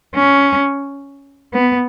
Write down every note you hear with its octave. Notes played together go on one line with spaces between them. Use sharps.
C#4
B3